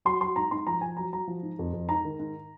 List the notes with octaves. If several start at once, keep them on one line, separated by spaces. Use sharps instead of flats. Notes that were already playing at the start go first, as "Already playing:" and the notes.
F#3 C6
F#3 C6
G#2 A#5
G#2 C6
F3 A#5
F3 G#5
F#3 A#5
F#3 A#5
F3
G#2
F2
F2
G#2 A#5
D#3
G#2